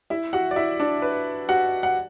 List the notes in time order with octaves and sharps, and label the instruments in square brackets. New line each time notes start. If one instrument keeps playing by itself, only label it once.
[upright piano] E4 E5
F#4 F#5
D5
E4 E5
D4 D5
B4
F#4 F#5
F#5